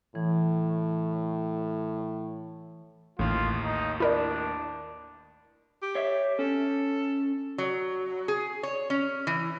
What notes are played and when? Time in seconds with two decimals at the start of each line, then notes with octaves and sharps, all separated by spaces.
0.15 A2 E3
3.19 A1 D#2 A2 F4
3.63 D#4
4.00 D4 E4 A#4 D5
5.82 G4
5.95 C#5 E5
6.39 C#4 A4
7.58 F#3
8.28 G#4
8.63 C#5
8.90 C#4
9.27 E3